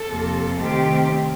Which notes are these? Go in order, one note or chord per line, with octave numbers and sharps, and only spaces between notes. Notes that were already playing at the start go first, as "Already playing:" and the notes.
Already playing: A4
F2 C3 F3 A#3
C3 D#3 A3 C4 G4